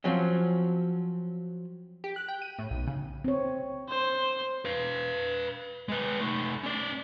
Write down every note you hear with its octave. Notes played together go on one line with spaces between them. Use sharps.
F3 F#3 C4 C#4
G4
F#6
G5
D#7
A2
B1
C#3
C4 C#5
C5
B4 F5
G#3 B4
A3 D#4
C#4 D5